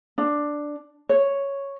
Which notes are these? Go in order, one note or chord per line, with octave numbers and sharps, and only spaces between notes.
D4
C#5